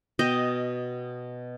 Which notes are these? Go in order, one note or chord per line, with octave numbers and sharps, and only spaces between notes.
B2 D#5 G5